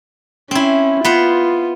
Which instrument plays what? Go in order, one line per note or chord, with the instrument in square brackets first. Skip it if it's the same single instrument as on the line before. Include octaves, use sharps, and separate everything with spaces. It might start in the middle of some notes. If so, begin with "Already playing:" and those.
[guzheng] C4 E4 [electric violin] C#4
[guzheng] B3 B4 C5 [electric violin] F4